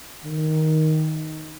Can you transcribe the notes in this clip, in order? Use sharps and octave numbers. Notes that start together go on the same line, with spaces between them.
D#3